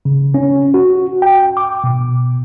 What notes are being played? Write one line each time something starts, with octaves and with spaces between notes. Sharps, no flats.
C#3
C#4
F#4
G5
D6
B2